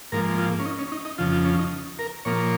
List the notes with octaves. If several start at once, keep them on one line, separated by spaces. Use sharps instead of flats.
G#2 F3 A#3 A#4
F4
C#4
D#4
C#4
D#4
D#4
F2 C#3 F3 F4
F4
C#4
D#4
A#4
A#2 F3 A#3 C#5